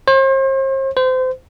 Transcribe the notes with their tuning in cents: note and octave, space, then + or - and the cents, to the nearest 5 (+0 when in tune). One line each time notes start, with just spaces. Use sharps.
C5 +40
C5 -30